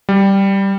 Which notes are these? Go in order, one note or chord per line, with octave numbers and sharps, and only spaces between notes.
G3